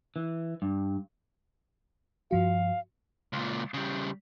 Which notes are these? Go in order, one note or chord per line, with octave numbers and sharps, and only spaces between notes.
E3
G2
G2 F3 F#4 F5
C#2 A#2
C#3 G3